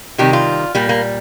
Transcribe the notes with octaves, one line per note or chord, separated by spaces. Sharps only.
C3 D#3 G3 G4
F4
A#2 G3 A#3
A#3